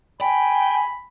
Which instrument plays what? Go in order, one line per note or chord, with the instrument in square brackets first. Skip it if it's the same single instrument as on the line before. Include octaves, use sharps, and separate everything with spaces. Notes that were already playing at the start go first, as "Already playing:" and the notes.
[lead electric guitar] G5 [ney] G#5 [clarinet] B5